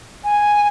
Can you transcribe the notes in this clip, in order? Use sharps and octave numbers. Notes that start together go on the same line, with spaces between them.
G#5